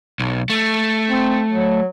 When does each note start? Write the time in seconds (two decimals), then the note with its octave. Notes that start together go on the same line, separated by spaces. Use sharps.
0.20 B1
0.50 A3
1.10 C4
1.51 F#3